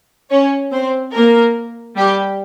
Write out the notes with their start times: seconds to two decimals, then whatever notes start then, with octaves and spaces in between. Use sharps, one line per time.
0.30 C#4 C#5
0.72 C4 C5
1.14 A#3 A#4
1.96 G3 G4